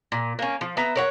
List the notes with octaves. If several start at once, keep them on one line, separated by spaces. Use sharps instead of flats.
A#2
A#3 C#4
F3
B3 E5 A#5
A#4 C#5 F#5